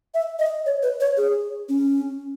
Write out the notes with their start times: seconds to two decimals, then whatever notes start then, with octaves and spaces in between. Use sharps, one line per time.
0.14 E5
0.39 D#5
0.66 C#5
0.83 B4
1.00 C#5
1.17 G#4
1.69 C#4